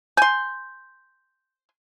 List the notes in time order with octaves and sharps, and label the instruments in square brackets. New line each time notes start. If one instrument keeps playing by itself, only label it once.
[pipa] G#5 C6 [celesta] G6